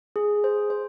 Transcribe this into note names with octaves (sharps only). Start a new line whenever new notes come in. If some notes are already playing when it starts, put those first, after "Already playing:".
G#4
C5
C5